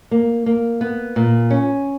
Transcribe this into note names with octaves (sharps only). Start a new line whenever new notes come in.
A#3
A#3
B3
A#2
C#4